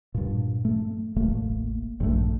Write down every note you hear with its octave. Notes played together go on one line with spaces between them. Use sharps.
G2 A#2
A3
E1 A1 A3 A#3
A#1 G2 E3 A3